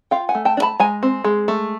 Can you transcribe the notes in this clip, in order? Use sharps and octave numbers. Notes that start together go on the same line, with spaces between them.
F4 F5 G5
F#5 G#5
A3
G5 A5
D4
A5 B5
G#3 G#5 A#5
C4
G#3
A3